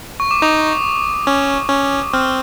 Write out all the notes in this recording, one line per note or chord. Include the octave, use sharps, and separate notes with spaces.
C#6
D6
D#4 D#6
C#4
C#4
C4 F6